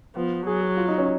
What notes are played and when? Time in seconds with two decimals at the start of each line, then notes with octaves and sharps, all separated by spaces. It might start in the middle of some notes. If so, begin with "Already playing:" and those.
0.16 F3 B3
0.46 F#3 G#4
0.61 G#4
0.77 F4
0.88 D#4
0.98 C#4